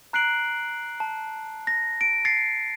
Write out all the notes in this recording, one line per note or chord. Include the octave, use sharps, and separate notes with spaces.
A#5 F#6 C7 D7 F#7
A5
A#6
D7
A6 A#6 C7 C#7